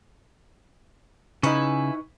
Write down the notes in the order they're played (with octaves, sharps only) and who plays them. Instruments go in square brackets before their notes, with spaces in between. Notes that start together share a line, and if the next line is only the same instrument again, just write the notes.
[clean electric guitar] C#3 [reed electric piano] D#4 C#6 [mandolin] E4 B4 G#5